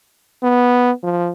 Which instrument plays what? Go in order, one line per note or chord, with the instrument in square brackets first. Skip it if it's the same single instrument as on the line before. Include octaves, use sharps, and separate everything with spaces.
[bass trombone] B3
F3